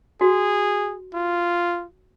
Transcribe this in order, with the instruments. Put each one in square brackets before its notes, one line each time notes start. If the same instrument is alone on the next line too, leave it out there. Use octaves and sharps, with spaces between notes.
[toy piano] F#4 [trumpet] G#4
[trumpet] F4